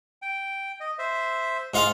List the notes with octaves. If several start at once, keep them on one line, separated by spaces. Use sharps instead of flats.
G5
D#5
C5 E5
G#2 F4 F5